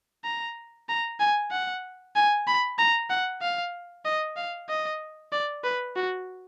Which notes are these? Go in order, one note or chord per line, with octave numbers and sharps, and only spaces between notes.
A#5
A#5
G#5
F#5
G#5
B5
A#5
F#5
F5
D#5
F5
D#5
D5
B4
F#4